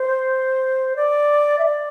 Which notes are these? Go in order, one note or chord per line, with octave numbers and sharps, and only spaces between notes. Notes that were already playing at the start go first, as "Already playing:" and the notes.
Already playing: C5
D5
E5
D5